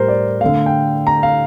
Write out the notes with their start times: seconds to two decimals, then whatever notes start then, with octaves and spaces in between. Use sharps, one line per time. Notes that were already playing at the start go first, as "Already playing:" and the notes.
Already playing: A2 G3 A#4 C5
0.08 D5
0.41 D3 A3 F5
0.66 G5
1.07 A#5
1.23 F5